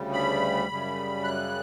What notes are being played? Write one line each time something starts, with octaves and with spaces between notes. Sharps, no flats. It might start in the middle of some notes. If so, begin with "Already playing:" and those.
Already playing: D2 C#3 G3
B5
F#2 C#3 G3
F#6